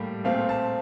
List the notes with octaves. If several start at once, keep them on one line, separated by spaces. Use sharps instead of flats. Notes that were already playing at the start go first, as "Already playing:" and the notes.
Already playing: A2 G3 A#3 G4
A#2 A3 C4 F5
A5